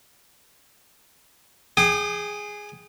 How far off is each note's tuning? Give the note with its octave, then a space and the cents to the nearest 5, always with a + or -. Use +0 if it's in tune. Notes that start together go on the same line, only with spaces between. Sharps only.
G#4 +0 G5 -10 D#6 -45